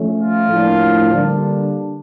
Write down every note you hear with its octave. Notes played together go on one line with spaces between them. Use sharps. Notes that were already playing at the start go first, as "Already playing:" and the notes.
Already playing: F3 A3 C#4
F4
A2 F3 A#3 D4
D3 G3 A#3 D4